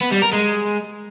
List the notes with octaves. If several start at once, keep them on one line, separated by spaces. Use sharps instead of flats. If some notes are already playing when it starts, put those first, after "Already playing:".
B3
G3
A#4
G#3